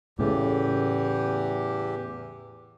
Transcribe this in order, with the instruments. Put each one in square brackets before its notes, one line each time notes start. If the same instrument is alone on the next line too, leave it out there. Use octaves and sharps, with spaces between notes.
[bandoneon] E2 E3 G4 [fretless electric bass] A2 C#3 A3